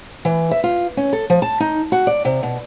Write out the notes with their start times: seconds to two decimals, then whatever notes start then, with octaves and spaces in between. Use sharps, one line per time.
0.25 E3
0.51 E5
0.64 F4
0.97 C#4
1.13 A4
1.30 F3
1.42 A5
1.60 D#4
1.92 F#4
2.07 D5
2.25 C3
2.43 B2